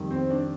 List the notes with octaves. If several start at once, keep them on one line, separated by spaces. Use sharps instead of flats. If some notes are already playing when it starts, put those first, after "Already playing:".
Already playing: F2 D#3 G3
C4 C5
D4 D5